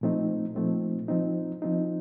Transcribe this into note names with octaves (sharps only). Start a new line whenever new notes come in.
A#2 F3 A3 C4 D#4
A#2 F3 A3 C4 D#4
F3 C4 D#4
F3 C4 D#4